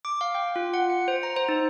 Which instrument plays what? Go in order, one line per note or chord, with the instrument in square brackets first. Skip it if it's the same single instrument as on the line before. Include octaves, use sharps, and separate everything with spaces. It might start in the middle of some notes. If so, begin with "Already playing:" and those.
[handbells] D6
F5
G5
F4
F#5
C#7
C5
A#5
C5
D#4